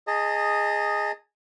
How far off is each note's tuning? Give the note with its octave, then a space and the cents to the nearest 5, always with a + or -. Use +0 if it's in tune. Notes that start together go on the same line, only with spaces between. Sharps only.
G#4 +0 D#5 -5 A5 +35